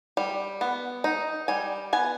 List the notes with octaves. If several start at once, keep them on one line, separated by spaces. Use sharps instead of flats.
G3
B3
D#4
G3 G#5
B3 G#5